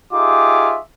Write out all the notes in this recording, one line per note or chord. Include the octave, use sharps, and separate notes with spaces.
D#4 F4 G4 G#4 E5 D6